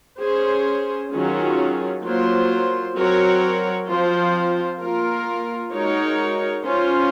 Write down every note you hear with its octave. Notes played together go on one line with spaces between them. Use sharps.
C#4 G#4 C5
D#3 F#3 C#4 F4 G#4
F#3 A#3 F4 C5
F#3 C4 F#4 A#4 C#5
F3 C4 F4 C5
A#3 F4 A#4
G#3 D#4 F#4 A#4 C#5
C#4 F4 C5